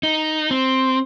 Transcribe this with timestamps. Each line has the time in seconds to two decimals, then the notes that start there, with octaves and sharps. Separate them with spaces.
0.03 D#4
0.51 C4